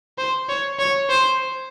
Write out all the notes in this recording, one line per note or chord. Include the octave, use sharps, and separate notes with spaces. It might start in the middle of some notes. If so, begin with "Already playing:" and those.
C5
C#5
C#5
C5